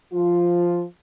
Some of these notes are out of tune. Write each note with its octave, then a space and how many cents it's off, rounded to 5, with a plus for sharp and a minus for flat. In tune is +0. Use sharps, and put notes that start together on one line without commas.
F3 +0 F4 +0